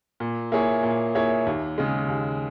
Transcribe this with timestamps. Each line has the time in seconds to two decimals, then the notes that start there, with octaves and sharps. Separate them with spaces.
0.20 A#2
0.52 A#3 E4 G#4 C#5
0.83 A#2
1.15 A#3 E4 G#4 C#5
1.46 D#2
1.78 C#3 G#3
2.08 D#2